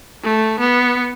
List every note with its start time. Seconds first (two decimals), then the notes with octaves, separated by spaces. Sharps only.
0.24 A3
0.60 B3